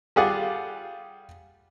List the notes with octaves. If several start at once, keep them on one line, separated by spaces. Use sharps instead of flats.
G3 F4 G#4 D5 F#5